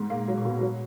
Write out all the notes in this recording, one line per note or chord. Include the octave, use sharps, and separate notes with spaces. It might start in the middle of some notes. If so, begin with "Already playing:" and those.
Already playing: G#2
A#2 A#3
F#3
A#2
B2
F#3